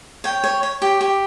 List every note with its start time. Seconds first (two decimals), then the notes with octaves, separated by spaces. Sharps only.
0.24 C#5 G5
0.44 C#5
0.63 C#5
0.82 G4
1.01 G4